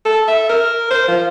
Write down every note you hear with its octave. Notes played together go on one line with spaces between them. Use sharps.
A4
E5
A#4
C5
F3